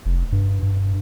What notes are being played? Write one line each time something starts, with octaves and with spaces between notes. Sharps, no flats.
F1
G2
G2